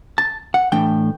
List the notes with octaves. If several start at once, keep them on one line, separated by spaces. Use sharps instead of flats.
A5
F#5
A2 E3 A3 D4 G5